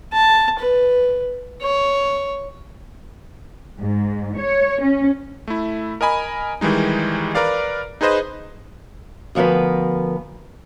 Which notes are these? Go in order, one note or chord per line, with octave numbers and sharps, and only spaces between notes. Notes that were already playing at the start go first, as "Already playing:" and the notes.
A5
B4
C#5
G#2
C#5
C#4
A3 E4
A#4 D#5 G#5 B5
D#3 E3 G3 G#3 D#4
A#4 B4 D5 F5
D#4 G#4 B4 C5 D#5
D2 F3 B3 A#4 B4